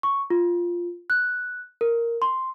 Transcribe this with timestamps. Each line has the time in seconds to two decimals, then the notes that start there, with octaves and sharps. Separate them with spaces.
0.03 C#6
0.30 F4
1.10 F#6
1.81 A#4
2.22 C6